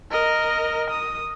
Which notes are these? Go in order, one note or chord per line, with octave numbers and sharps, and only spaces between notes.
A#4 D#5
D#6